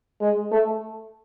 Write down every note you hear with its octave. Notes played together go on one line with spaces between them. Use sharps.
G#3
A3